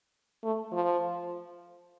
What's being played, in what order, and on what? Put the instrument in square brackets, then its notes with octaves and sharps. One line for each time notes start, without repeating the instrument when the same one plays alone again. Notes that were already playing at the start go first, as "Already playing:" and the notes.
[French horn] A3
F3